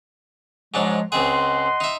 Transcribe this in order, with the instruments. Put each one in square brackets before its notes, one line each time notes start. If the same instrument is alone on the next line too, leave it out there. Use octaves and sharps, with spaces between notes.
[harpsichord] G#2 F#3 D4 [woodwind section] F3 G#3
[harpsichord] C#2 C4 G#4 [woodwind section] D#5 F#5 C6
[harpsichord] D#4 E5